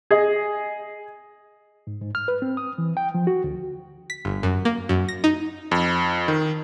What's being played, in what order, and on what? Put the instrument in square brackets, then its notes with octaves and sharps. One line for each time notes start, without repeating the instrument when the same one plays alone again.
[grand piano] G#4 D#5
[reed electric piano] G#2
G#2
F6
B4
C4
D#6
E3
G5
F3
F#4
D2
[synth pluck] B6
G1
F#2
A#3
F#2
A#6
D#4
[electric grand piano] F2
D#3